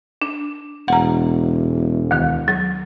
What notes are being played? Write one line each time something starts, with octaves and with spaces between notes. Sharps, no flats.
D4
E1 F#5 A#5
D2 D#3
F#3